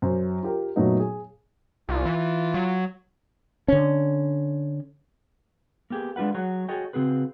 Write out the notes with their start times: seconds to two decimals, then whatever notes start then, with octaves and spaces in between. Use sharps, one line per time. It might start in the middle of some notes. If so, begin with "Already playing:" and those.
0.02 F#2 C5
0.43 F4 G4 A#4
0.76 F#2 A#2 F#3 A3 B3 D#4
1.00 G#4
1.89 C2 F4
2.06 E3
2.54 F#3
3.68 D3 C#4
5.90 A#3 B3 G4 G#4
6.16 G#3 D4 F4 B4 F#5
6.34 F#3 G#4 C#5 F#5
6.68 F#4 G#4 A4 C#5 D#5 G5
6.93 C#3 C4 F#4 G#4 B4